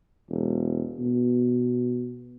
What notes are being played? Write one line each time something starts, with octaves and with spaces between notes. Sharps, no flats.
E1
B2